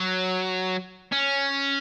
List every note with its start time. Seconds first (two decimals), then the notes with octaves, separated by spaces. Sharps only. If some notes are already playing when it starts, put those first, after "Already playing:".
Already playing: F#3
1.12 C#4